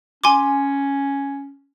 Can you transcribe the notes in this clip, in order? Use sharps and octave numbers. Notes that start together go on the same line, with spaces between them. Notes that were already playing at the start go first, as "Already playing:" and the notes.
C#4 G#5 C6 D6